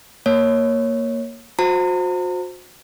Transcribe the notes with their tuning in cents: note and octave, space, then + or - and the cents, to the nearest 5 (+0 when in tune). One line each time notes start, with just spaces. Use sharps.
A#3 +0 C#5 +0
F#4 -35 C5 +0 A#5 -40